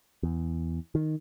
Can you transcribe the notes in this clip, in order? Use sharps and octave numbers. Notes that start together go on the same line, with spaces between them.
E2
D#3